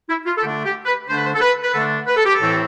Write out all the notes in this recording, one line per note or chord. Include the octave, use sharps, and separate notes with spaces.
E4
F4
A4
D3 A3 D4 G4
G4
B4
D3 A3 D4 C5
B4
C5
A4
B4
B4
D3 A3 D4 A4
B4
A4
G4
A4
A2 E3 A3 C4